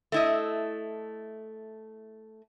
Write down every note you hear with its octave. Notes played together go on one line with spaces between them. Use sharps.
A3 E4 D#5